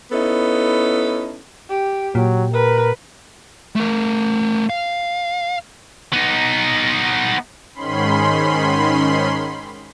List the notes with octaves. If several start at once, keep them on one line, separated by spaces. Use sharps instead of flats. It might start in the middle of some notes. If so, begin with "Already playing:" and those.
B3 C#4 D#4 E4 A4
G4
A#2 F#3
A#4 B4
A3 A#4
F5
B3 D#4
G#2 D#3 C#4 B5 C6